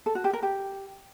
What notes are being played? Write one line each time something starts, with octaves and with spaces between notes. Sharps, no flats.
A4
F#4
G4
A#4
G4